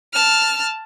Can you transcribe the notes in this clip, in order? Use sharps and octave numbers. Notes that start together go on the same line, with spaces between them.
A5 F6